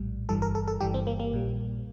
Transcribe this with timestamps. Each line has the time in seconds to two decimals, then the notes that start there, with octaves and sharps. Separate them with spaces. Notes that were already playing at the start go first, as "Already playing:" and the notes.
Already playing: A#1 A2 G3
0.29 G1 G2 E3 G3 A4
0.42 A#4
0.55 A4
0.68 A4
0.81 G1 G2 E3 G3 G4
0.94 C4
1.07 A#3
1.20 A#3
1.32 A#1 A#2 G3